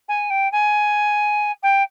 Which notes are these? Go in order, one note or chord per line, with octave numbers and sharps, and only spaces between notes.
G#5
G5
G#5
G5